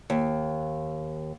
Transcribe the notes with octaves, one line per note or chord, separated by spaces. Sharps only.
D#2